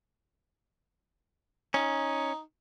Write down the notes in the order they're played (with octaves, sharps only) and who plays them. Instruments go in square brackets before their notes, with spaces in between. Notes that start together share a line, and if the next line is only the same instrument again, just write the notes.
[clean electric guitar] C#4 [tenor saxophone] D#4